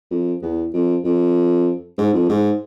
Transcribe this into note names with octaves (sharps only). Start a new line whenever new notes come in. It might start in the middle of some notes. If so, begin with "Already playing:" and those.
F2
E2
F2
F2
G#2
F2
G#2